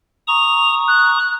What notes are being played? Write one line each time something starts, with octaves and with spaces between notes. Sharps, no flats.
A#5 C#6 D#6 F7
F#6